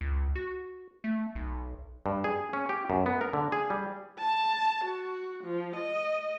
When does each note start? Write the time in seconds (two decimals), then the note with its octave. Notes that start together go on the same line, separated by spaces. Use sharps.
0.01 C#2
0.35 F#4
1.04 A3
1.35 B1
2.06 G2
2.24 G#4
2.53 C#4
2.69 G4
2.90 F#2
3.06 B3
3.21 A#4
3.33 D3
3.52 G#4
3.70 G3
4.19 A5
4.84 F#4
5.44 F3
5.76 D#5